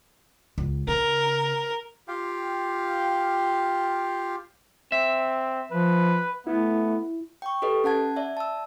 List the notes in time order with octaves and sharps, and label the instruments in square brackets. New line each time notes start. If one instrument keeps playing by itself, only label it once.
[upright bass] C#2
[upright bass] C#3 [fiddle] A#4
[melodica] F4 G4 F5 G5
[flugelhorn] C4 [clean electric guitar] E5
[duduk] F3 [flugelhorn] B4
[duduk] A3 [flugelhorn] B3 [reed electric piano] E4
[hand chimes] G5 C#6
G4 A4 B4 D#5
C#4 F#5 A5 G#6
D5 E5
A5 E6